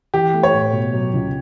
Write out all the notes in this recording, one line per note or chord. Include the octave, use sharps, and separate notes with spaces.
E3 G4
A3
C#5
A2
B2
F#3
C#2